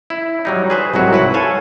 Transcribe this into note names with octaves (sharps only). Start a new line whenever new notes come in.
E4
F#3 G3 D#4
G#4 B4 C5
C2 G#2 F#3 F#4
E4 B4 F#5
A4 C#5 F5 G#5